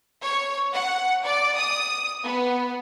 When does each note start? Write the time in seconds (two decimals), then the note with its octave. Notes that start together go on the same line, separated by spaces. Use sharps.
0.21 C#5
0.74 F#5
1.25 D5
1.56 D#6
2.22 B3